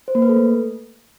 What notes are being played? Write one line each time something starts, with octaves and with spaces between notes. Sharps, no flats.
C5
A#3
B4
A4
A3